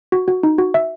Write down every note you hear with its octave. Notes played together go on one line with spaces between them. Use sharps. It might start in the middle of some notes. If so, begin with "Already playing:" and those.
F#4
F#4
D#4
F#4
E5